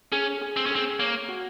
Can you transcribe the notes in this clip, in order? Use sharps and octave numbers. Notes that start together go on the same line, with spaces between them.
C#4 G#4
G#4
C4
C#4
C4 G#4
A#3 C#5
F#4